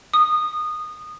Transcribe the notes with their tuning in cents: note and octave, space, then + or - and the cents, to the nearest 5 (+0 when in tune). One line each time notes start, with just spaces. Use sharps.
D#6 -20